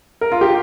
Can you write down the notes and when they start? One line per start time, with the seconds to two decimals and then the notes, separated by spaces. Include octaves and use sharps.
0.21 A#4
0.32 F4
0.41 G4